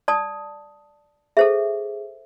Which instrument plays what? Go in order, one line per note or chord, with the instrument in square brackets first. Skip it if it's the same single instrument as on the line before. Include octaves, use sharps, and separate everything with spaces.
[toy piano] D5 A5 D#6
[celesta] G#4 [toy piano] A4 C5 E5